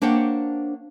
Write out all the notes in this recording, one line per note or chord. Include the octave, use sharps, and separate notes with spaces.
A#3 D4 C5 C#5 F#5 G5